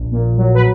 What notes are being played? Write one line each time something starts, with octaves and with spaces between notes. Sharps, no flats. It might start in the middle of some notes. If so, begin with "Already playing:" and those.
Already playing: A#1
A#2
F#3
B4